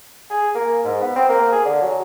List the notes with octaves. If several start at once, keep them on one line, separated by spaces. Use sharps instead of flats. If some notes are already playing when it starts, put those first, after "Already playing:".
G#4
A#3
G#2
B3
C4
A#3
G#4
D3
F#3